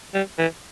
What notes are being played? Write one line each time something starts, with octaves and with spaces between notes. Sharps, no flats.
G3
E3